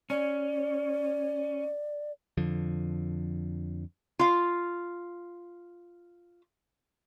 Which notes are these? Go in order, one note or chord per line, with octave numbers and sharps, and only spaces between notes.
C#4 D5
F2 D3 F3
F4 F5